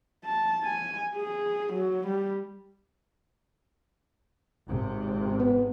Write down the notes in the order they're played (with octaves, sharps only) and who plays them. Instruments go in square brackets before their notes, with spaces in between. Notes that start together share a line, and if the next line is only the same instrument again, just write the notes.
[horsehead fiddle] A5
G#5
G#4
F#3
G3
[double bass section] G#1 C3
[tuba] B3